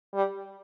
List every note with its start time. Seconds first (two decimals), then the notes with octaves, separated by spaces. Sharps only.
0.14 G3